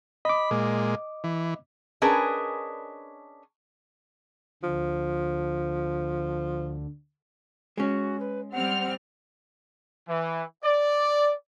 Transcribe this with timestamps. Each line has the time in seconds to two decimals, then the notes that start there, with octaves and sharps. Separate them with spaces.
0.25 D#5 B5 D6
0.51 A#2 G#3
1.24 E3
2.02 C#4 D4 G#4 A#4 B4 D#5
4.63 D2 D3 F3
7.77 G#3 C#4 F#4
8.20 B4
8.53 G3 C4 F#5 F6
10.08 E3
10.64 D5